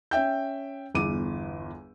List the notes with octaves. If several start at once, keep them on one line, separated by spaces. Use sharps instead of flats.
C#4 E5 G5 G6
G1 E2 D6 D#7